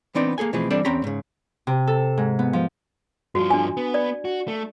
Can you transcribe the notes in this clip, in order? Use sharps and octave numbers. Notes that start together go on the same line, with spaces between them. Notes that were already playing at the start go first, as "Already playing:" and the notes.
E3 B3 C4 D4 D#4 D5
A#3 G#4 A4 G#5
B2 E3 F3 A3 C4 G#4
E3 G3 C4 D4 A4 D5
E2 C4 C#4 G5 A#5 B5
G#2 C#3
C3
A4
G#2
B3
F3
G2 F3 F#4
D4 G#5
B3
D5
F#4
A3